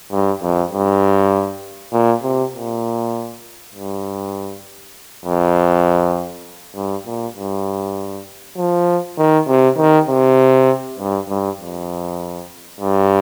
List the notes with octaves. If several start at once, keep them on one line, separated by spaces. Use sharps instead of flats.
G2
F2
G2
A#2
C3
A#2
G2
F2
G2
A#2
G2
F3
D#3
C3
D#3
C3
G2
G2
F2
G2